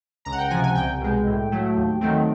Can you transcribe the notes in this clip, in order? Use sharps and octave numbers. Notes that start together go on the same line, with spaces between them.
C#2 A#5
F#5
G5
C3 F3 G#5
G#5
C2 G5
B2 G#3
A2
F#3 A3
D#2
D#3 F#3 A3 C4